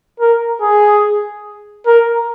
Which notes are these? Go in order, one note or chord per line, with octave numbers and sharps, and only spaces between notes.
A#4
G#4
A#4